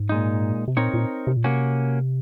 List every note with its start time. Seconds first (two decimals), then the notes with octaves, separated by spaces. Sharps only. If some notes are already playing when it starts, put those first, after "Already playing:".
Already playing: G#2
0.09 A#2 G#3 D#4
0.68 C3
0.77 A#2 C4 D#4 A#4 C#5
0.94 A#2
1.27 C3
1.37 A#2
1.44 C3 A#3 C#4 F#4